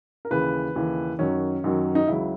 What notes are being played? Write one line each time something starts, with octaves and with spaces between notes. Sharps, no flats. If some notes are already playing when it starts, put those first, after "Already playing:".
A#4
D#2 C#3 E3 B4
D#2 C#3 E3
F#2 D#3 F#3 C#4
F#2 D#3 F#3
D#4
C#2 C#3 F#3 E4